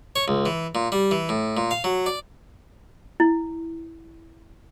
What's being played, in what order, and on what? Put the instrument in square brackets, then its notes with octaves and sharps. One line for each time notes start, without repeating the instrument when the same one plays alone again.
[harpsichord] C#5
C#2
E3
A#2
G3
E3
A2
A#2
F5
F#3
D5
[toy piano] E4